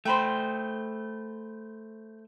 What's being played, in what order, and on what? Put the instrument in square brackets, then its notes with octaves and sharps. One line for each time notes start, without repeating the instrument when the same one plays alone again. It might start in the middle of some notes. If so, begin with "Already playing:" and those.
[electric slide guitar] A3 C5 [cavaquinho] G5 B5 C6